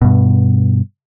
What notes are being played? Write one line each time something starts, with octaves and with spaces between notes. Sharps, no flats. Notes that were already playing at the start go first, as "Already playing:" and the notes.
G2 B2